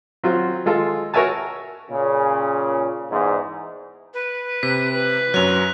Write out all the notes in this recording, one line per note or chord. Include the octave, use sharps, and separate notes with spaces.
F#3 C4 F4
G#3 F4 A4
F#4 A#4 C#5 E5 G#5 A5
A#2 C#3
E2 G#2
B4
C3 B6
B4
F#2 F#3 A#4 F#6 F7